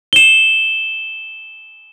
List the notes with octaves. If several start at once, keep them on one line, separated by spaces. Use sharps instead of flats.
E7 G7